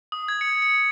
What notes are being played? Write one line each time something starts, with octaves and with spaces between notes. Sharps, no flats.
D#6
G#6
C#7
C#7